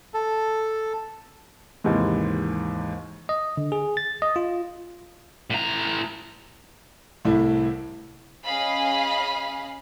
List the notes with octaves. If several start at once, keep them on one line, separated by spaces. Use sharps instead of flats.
A4
D#2 G#2 C3 E3 G#3
D#5
D3
G#4
A6
D#5
F4
A2 A#5
C2 A2 A3 E4
C#4 G#4 D#5 F5 B5